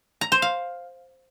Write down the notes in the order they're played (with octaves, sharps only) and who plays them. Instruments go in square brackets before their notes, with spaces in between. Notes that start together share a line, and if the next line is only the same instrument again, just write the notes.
[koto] A#5
C5
F5